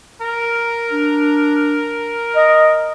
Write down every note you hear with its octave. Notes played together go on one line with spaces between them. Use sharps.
A#4
D4
D#5